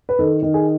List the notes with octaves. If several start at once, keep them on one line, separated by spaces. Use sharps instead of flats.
B4
D#3 A4
D#3
G#4